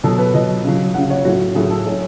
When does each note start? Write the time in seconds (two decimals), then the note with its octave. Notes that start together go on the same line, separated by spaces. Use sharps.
0.04 B2 F#3 A4
0.19 B4
0.34 B2 F#3 D#5
0.64 C#3 F#3
0.94 C#3 F#3 F#5
1.10 C#5
1.25 A2 F#3 F#4
1.55 A2 F#3 G#4
1.70 A4
1.86 A2 F#3 C#5